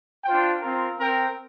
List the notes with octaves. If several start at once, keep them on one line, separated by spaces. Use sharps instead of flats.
D4 F4 C5 G5
C4 F4 A#4
C4 A#4 G5